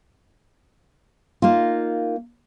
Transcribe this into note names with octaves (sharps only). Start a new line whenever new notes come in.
A#3 D#4 F4